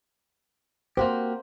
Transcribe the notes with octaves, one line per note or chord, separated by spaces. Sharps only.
A#3 F#4 G4 C5